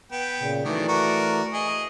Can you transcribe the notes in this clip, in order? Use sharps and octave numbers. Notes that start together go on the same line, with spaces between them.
B3 G5
A#2 C#3
D#3 E3 F#3 A3 D5
F#4 A#4
G#4 D#5